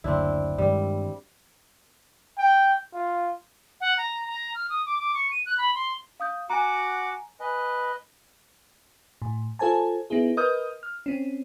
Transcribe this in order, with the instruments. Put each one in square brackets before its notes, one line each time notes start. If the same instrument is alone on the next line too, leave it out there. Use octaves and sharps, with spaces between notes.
[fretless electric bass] F#1 D2 [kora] C4 D4 E4
[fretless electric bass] G2 D#3 G#3 [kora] G3
[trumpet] G5
F4
[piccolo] F#5
A#5
A#5
F6
D#6
D6
D6
C#6
D#7
F#6
B5
C6
[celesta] F5 D#6 G6
[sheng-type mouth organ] F#4 F#5 D6 [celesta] G#5 A#5
[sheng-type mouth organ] B4 D#5 [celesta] G#5
[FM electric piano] A2
F4 A4 C5 G#5 A5
B3 D#4 E4 G#4
A#4 B4 D#5 D#6 F6 G6
F6
C4 C#4